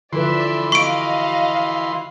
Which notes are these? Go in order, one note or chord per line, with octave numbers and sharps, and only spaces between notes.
D3 E3 F3 B4 D5 E5 C6
F#4 D#5 F5 C#6 D7